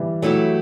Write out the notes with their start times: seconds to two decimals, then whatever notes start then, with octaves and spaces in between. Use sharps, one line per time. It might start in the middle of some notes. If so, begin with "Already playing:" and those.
Already playing: E3 G3
0.22 F#3 A3 E4 G4